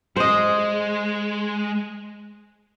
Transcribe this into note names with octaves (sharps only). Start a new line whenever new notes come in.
G#3 C5 D#5